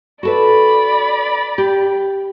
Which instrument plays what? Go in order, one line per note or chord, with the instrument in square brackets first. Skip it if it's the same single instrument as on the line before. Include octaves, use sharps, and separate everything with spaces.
[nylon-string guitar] F#4 A4 B4 [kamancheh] D5 B5
[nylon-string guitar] G4